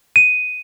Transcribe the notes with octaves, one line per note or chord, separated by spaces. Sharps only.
D#7